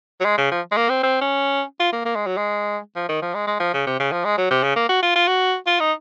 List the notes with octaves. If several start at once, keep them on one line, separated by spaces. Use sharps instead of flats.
F#3
G#3
C#3
F3
G#3
A#3
C4
C4
C#4
F4
A#3
A#3
G#3
F#3
G#3
F3
D#3
F3
G#3
G#3
F3
C#3
C3
C#3
F3
G#3
F#3
C3
C#3
A#3
F#4
F4
F4
F#4
F4
D#4